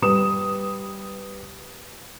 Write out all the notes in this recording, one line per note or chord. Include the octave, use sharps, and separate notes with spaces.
G3 B4 D#6 E7